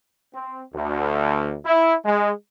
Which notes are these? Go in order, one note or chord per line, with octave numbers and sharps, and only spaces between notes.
C4
D2
E4
G#3